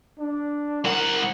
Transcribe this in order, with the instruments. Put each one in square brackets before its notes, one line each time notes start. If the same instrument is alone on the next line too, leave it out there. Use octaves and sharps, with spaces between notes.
[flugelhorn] D4
[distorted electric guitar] C2 F#5 [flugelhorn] A#4